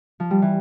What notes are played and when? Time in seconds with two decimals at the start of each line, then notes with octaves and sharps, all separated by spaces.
0.20 F3
0.31 G3
0.42 E3